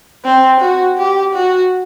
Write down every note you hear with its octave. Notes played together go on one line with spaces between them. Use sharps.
C4
F#4
G4
F#4